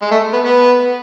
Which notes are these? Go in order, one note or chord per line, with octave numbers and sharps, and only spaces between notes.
G#3
A3
B3
B3